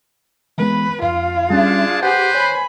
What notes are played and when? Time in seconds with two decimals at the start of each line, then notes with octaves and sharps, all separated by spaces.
0.58 E3 G#3 B3 B4
1.02 F2 F4 F5
1.50 G3 C#4 D4 G#4 A5
2.03 G4 G#4 B4 C5 F#5
2.35 C#5 G#5 B5